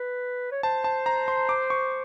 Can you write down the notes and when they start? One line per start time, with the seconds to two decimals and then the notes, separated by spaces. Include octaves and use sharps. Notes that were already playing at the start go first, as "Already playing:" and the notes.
Already playing: B4
0.52 C#5
0.63 C5 A5
0.84 A5
1.06 A#5
1.28 C6
1.49 D6
1.70 C#6